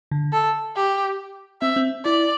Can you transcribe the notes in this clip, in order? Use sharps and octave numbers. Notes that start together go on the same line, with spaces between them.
D3
A4
G4
C4 E5
C4
E4 D5